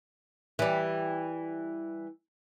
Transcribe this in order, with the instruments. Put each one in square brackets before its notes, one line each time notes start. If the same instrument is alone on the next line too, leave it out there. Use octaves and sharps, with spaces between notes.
[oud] E3 G3